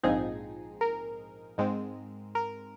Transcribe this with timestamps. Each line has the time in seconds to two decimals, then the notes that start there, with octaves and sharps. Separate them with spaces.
0.03 A#1 G#2 F3 C4 D#4 G#4
0.81 A#4
1.58 G#2 G#3 C4
2.35 A#4